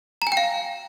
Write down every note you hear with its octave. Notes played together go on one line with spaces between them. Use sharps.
A#5
G#5
G5
F5